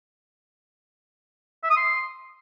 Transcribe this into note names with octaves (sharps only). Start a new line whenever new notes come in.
E5
D#6
C6